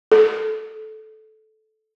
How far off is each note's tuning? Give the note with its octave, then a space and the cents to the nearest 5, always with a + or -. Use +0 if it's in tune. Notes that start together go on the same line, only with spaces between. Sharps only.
A4 -15